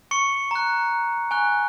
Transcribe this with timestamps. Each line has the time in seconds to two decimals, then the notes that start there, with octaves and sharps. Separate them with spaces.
0.11 C#6 C#7
0.51 A#5 F#6
1.31 G#5 C#6 F#6